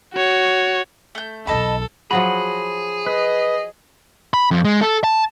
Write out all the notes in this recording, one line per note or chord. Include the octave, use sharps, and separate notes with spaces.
F#4 C#5
A3 G6
B1 E2 A4 D#5 A5 B5
F3 F#3 F#4 G#4 B5
B4 D#5
B5
F2
G#3
A4
A5